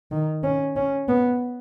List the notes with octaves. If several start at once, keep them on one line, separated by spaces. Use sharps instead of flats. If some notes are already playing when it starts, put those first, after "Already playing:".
D#3
C#4
C#4
B3